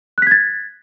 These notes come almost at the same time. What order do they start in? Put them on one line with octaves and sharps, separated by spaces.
F#6 B6 G#6 A6